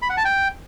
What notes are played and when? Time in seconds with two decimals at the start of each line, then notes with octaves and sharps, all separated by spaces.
0.02 B5
0.10 F#5
0.17 A5
0.25 G5